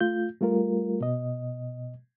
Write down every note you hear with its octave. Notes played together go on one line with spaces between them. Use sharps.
A3 F4 G6
G3 A3 F4 A#4
B2 D#5